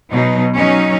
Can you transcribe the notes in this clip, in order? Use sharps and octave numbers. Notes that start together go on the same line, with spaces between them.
B2 F#3 D#4
F#3 C#4 D#4